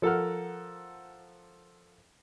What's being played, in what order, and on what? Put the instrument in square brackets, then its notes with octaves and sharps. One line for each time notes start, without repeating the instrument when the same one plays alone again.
[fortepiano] F3 A4 A#4 F#5 F6